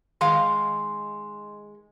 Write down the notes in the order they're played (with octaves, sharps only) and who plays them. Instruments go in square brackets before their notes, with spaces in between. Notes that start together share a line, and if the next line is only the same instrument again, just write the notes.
[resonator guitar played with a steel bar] D#3 G#3 F5 [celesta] C6